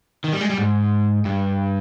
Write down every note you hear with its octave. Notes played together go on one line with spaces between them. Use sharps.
D#3
G3
G#3
G3
G#2
G2